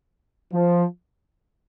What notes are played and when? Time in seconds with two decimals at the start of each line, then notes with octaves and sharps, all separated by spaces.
0.53 F3